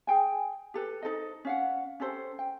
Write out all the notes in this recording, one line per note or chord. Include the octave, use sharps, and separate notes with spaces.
G#4 G5 G#5
G4 A4 B4
D#4 A4 C5 D#5
C#4 F5 F#5
C#4 G4 A4 C5
G5